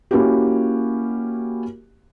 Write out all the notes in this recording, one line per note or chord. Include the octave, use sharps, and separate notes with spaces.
A#3 C#4 E4 F#4 G4